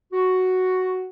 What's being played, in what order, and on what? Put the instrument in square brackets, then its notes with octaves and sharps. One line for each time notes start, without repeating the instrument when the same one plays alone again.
[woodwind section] F#4